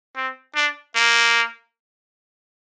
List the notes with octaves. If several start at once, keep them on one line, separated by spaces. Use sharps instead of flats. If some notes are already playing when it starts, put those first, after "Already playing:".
C4
D4
A#3